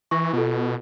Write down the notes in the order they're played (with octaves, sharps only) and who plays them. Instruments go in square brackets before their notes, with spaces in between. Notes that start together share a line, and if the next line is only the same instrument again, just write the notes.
[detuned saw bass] E3 [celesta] C#6 A#6
[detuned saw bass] B2 [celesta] F4 A4